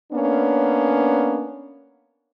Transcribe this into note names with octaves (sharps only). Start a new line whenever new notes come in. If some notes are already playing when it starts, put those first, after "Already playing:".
A#3 B3 C#4 D4